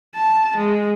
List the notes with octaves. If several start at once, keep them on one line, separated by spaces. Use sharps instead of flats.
A5
G#3